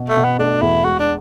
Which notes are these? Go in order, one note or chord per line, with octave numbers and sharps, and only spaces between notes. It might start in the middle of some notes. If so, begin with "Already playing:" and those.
Already playing: B2
A3
B2
B3
A3 D4
E2 E4
G#3 F#4
D4